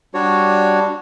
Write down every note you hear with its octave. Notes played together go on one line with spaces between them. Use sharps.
G3 D4 F#4 C#5